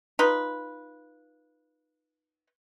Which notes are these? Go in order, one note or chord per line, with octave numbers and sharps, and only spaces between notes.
D#4 F4 B4